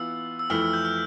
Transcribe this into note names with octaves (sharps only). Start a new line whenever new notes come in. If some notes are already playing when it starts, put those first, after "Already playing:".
Already playing: E3 B3 F4 E6
E6
F2 E3 A3 E4 F6
E6
G6
F6